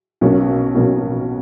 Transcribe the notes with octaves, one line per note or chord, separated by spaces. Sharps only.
B1 B2 A#3 C#4
B1 B2 A#3 C#4